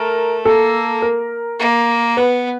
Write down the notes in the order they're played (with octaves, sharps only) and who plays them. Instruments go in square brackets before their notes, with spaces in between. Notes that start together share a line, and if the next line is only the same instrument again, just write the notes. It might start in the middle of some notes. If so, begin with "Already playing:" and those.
Already playing: [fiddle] A3 [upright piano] A#4
[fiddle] A#3 [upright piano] A4
[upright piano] A#4
[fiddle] A#3
[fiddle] B3 [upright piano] B4